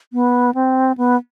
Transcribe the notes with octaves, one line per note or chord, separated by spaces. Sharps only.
B3
C4
B3